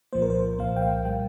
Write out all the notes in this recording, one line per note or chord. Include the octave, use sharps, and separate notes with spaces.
C2 A#2 F3 A#3 C5
A#4
C5
C2 A#2 F3 A#3 F5
G5
F5
A#2 G3 G5